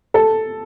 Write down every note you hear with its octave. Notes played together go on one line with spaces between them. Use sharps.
A4